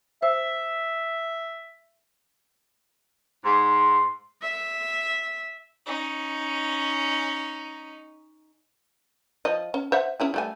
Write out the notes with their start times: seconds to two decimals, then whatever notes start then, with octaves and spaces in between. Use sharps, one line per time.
0.23 C5 E5 E6
3.44 G#2 C6
4.42 E5
5.86 C#4 D#4
9.45 F3 D#5
9.74 C#4
9.92 C5 E5 F#5
10.20 C#4 E4 G#4
10.34 G3 A3 G#5